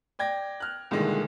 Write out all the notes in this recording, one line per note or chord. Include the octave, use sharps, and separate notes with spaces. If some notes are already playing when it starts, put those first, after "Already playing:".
D5 G5 G#6 A#6
F6 F#6
C2 A#2 D3 D#3 G#3